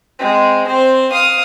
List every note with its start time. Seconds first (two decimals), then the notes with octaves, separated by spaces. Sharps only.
0.19 G#3 C4
0.67 C4 C5
1.12 F5 D#6